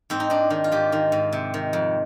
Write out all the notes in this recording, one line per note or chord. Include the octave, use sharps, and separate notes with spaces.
G#2 C4
D#4
G#2 D4
D#3
F4
G#2 G4
D#3
G#2
C3
D#3
F2